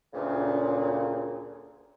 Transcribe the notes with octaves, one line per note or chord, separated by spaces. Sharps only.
D2 A#2 C#3